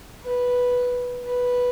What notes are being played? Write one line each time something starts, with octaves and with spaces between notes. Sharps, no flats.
B4
B4